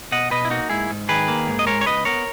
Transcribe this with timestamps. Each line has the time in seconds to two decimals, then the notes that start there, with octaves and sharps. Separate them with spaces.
0.12 B2 D#5 F#5
0.31 B2 B4 D#5
0.45 E4
0.50 A#3 D#4 F#4
0.70 G#2 E4 G#4
0.90 G#2
1.09 D#3 G#4 B4
1.28 A#3
1.48 G#2
1.59 D#5
1.67 G#3 A#4 C#5
1.81 C#5
1.86 C#2 B4 D#5
2.05 B3 A#4 C#5